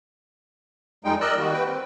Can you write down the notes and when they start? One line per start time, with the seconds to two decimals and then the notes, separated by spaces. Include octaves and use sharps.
1.04 F2 G3 G#3 D#4 G5
1.21 A#4 D5 D#5 E6 F#6
1.38 D#3 G3 A#3 F#4
1.53 B4 G5
1.65 C4